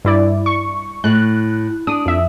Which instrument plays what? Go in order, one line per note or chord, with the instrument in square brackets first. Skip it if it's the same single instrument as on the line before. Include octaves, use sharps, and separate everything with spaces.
[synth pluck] G2 E4 D5
C#6
[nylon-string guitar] A2 [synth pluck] F#6
[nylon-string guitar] D4 [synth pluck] D#6
[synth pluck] F2 E5